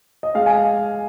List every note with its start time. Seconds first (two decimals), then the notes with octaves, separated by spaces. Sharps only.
0.23 D#5
0.35 G#3 F5
0.46 G#5